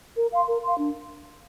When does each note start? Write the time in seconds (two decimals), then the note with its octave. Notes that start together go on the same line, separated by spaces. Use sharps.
0.16 A#4
0.31 F5 C6
0.48 A#4
0.63 F5 C6
0.79 D4